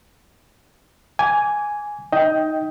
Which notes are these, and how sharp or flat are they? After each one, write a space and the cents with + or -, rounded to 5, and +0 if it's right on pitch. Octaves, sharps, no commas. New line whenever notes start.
G#5 +0 D6 -25
D#4 +0 D#5 +20 G5 +0